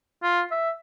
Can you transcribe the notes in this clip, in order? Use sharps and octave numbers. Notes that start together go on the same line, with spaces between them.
F4
E5